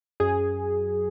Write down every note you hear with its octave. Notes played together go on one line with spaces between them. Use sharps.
F#2 G#4